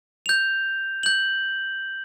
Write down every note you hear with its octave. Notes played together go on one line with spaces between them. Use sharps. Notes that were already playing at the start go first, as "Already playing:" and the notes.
G6 F7
G6 F#7